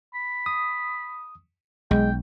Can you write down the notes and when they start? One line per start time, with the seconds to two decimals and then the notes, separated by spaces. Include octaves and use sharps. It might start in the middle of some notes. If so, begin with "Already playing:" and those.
0.15 B5
0.46 D#6
1.91 B1 G#3 G5